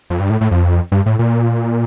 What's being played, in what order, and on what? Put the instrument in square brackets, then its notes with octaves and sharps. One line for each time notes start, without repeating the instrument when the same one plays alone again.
[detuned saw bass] F2
G2
A2
A2
F2
G2
A2
A#2